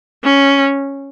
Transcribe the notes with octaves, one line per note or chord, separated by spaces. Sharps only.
C#4